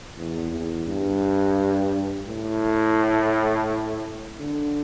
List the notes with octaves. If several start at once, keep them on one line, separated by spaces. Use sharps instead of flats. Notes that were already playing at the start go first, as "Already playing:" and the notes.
E2
E2
G2
A2
D3